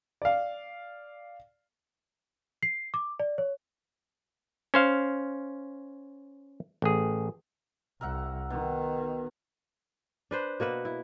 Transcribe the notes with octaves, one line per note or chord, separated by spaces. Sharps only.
D5 F5
C7
D6
D5
C#5
C#4 C5 F5
A1 G#4
C2 A#4 E5 F#5
B2 D#3
D4 B4 C5
B2 A#3 F#4 B4
E4